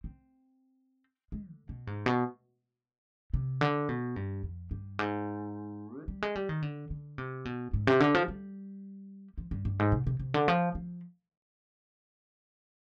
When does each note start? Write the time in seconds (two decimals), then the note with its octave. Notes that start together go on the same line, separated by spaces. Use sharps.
0.04 C4
1.32 G#3
1.50 D3
1.69 B2
1.87 G#2
2.06 B2
3.34 C3
3.61 D3
3.89 B2
4.16 G2
4.43 F2
4.71 G2
4.99 G#2
6.00 F3
6.08 G3
6.22 G#3
6.35 G3
6.49 D#3
6.62 D3
6.90 D3
7.18 C3
7.45 B2
7.73 G#2
7.87 C3
8.00 D3
8.15 F3
8.28 G3
9.38 F3
9.51 G2
9.65 G2
9.79 G#2
9.92 C3
10.07 C3
10.19 C3
10.34 D3
10.48 F3
10.75 F3